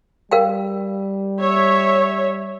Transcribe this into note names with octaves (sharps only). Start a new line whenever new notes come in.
G3 A#4 F5 G5
C#5 E5